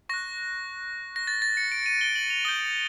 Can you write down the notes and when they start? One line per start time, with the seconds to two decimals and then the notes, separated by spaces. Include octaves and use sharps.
0.09 C#6 F#6 A#6
1.16 A#6
1.27 A6
1.42 A6
1.57 C#7
1.72 D7
1.86 D#7
2.01 G7
2.16 F#7
2.30 F7
2.45 D#6 G6 G7